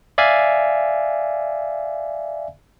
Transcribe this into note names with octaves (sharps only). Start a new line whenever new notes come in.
D5 E5 F5 G#5